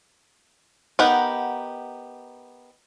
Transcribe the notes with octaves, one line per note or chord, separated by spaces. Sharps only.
B3 D#4 G4 A#4 F#5